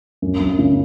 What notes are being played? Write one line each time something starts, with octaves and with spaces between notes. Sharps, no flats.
F#2
F#2
C#3